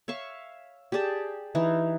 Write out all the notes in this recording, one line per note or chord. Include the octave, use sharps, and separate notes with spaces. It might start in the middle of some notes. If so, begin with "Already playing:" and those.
C#5 E5 F5 C#6
G4 G#4 D5 A5
E3 D#4